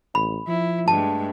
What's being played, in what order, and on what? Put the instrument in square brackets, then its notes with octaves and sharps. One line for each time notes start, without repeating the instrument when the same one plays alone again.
[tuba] A1 [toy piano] B5
[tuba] F3 [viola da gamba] E4
[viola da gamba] G2 G#3 A3 [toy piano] A5